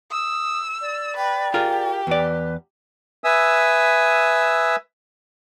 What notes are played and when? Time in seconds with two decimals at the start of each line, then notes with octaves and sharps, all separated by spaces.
0.11 D#6 E6
0.81 D5
1.17 B4 G5
1.54 F4 G4 G#4 A#4
2.07 E2 B4 D5
3.24 B4 E5 G#5 D#6 E6